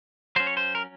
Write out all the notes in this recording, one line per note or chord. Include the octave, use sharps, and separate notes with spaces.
F#3 C#4 C5
C#5
C5
A#4